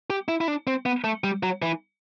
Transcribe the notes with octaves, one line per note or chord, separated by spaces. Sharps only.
G4
E4
E4
D4
C4
B3
A3
G3
F#3
E3